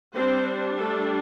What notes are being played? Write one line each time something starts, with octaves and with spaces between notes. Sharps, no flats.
G3 C4 D4 C5
A3 A4